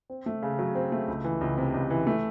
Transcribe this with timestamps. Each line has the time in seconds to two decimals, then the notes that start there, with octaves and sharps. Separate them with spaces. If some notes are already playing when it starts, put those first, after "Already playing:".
0.10 C4
0.26 A3
0.43 C#3
0.59 F#3
0.75 C4
0.92 A3
1.08 C#2
1.24 E3
1.41 C#2
1.58 C3
1.74 C#2
1.90 E3
2.07 A3